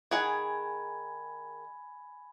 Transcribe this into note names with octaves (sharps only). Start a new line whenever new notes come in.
D#3 G#4 F#5 G#5 B5 G#6